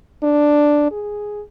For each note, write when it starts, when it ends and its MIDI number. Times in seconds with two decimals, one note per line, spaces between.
0.23 0.90 62
0.91 1.41 68